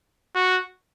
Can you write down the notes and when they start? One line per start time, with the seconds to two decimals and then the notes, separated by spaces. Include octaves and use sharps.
0.35 F#4